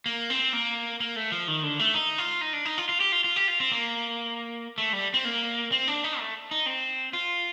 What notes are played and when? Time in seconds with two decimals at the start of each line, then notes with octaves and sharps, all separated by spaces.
0.06 A#3
0.30 C4
0.53 A#3
1.00 A#3
1.16 A3
1.32 F3
1.48 D#3
1.63 D3
1.79 A3
1.94 D#4
2.18 F4
2.41 D#4
2.53 D4
2.65 D#4
2.78 F4
2.89 F4
3.00 G4
3.12 F4
3.24 F4
3.36 G4
3.48 F4
3.60 C4
3.71 A#3
4.78 A3
4.93 G3
5.14 C4
5.25 A#3
5.72 C4
5.88 D4
6.04 D#4
6.19 A3
6.51 D#4
6.66 C4
7.13 F4